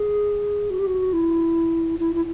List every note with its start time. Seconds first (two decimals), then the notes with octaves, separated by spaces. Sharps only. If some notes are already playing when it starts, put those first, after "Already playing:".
Already playing: G#4
0.70 F#4
0.79 G4
0.87 F#4
1.13 E4
1.99 E4
2.15 E4